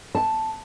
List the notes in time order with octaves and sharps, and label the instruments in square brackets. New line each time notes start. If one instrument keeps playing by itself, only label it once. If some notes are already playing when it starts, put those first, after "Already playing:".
[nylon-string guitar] A5